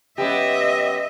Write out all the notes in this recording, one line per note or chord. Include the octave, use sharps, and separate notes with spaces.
F#2 B3 G4 D#5 E5